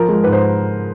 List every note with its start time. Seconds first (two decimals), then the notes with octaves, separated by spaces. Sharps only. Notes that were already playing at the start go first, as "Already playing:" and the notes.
Already playing: F3 A#4
0.09 G#3
0.24 G#2 B4
0.33 C5